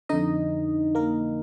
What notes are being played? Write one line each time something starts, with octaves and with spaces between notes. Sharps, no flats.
F2 D3 D#4 D#5
A#3 A#4